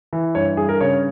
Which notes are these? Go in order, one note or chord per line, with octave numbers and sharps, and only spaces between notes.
E3
G2 C#5
G2 G#4
A#4
C#3 C#5